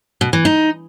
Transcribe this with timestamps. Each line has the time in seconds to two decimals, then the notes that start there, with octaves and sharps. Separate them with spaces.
0.21 B2
0.33 E3
0.45 D#4